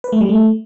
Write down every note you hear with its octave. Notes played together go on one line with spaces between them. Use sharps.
B4
A3
G3
A3